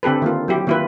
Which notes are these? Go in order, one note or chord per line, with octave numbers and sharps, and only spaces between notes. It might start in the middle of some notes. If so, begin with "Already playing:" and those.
D3 C4 G4 A4 B4
D#3 A#3 F4
F#3 E4 G4
D#3 A#3 E4 F4 B4